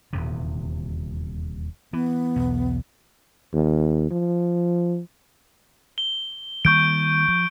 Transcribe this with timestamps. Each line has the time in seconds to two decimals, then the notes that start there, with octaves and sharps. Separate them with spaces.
0.13 D#1 E2 C3
1.93 E3 B3
2.36 B1 E2
3.53 D#2
4.11 F3
5.98 G7
6.65 D#3 G3 A#3 C#6 G6 D7
7.28 F3